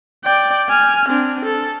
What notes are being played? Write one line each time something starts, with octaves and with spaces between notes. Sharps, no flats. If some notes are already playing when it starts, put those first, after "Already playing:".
D5 G5
G#5 F6
C4 D4
A4